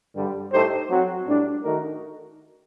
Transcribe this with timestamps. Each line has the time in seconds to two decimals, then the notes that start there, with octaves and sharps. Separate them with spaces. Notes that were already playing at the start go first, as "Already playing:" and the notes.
0.15 G2 D3 G3
0.52 A2 A3 D#4 G4 C5
0.89 F#3 C4 F#4
1.26 A2 G3 D4
1.63 D#3 A3 D#4 F#4 A#4